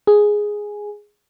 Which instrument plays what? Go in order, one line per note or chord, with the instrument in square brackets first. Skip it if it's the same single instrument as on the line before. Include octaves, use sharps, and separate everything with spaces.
[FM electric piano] G#4